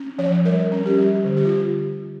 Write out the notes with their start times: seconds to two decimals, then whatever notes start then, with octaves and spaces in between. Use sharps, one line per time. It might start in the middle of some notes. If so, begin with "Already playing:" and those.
Already playing: C#4
0.18 F3 C#5
0.45 G3 A#4
0.72 C#4
0.86 G4
0.98 G3
1.24 D3
1.37 G4
1.45 F4